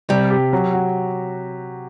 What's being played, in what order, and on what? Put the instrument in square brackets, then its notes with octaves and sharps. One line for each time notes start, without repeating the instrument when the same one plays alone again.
[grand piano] C3 [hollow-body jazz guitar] G3
[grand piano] G4
F#3
F#4